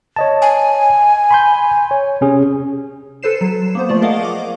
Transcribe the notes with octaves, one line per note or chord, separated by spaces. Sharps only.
C#5 D#5 A5
G#5
B5 C6 G6
C#5
C3 C#4 G#4
A4 B4 C5 C7 E7
F#3 E7
A#3 B3 C5
F3 A3 F4 D5
G#4 A#4 D#5 F5 F#5
D6